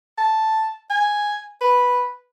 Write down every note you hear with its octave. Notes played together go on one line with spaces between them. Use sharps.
A5
G#5
B4